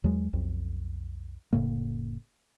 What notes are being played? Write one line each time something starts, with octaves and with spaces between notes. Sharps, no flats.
E2 F#3 G#3
B1 F2
F1 A2 C#3 A#3